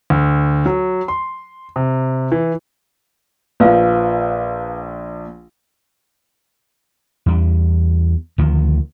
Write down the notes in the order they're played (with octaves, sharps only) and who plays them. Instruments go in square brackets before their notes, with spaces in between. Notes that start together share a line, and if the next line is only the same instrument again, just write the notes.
[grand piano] D2
F#3
C6
C3
E3
[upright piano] A#1 F3 [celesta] B4 F5
[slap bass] E2 G3
D2 D#3 F3